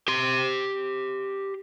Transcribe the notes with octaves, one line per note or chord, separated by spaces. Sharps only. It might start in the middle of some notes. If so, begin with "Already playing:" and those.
G4 C6